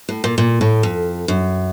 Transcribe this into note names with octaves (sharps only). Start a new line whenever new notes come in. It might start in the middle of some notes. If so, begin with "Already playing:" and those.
A2
A#2
A#2
A2
F2
F#2